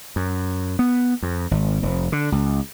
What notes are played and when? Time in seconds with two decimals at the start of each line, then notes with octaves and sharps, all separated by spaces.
0.16 F#2
0.79 B3
1.23 F2
1.51 G#1
1.83 F1
2.12 D3
2.32 C#2